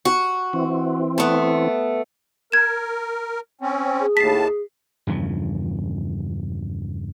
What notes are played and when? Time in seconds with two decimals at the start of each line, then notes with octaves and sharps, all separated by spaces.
0.05 F#4
0.53 E3 C4
1.18 A3 B3
2.52 A#4 G#6 E7
3.61 C4 C#4
4.00 G#4
4.17 D#2 A2 A5 B6 C7
5.07 E2 G2 C#3 F3